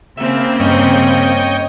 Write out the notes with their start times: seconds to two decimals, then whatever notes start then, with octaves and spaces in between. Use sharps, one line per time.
0.17 C#3 A#3 C4 E5
0.60 G2 C#5 D#5 G5